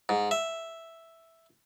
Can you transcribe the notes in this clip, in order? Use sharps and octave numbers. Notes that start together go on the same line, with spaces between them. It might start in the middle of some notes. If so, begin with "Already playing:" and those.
G#2
E5